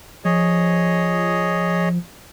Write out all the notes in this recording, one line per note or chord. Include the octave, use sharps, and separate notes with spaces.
F3 G#4 C#5 D#5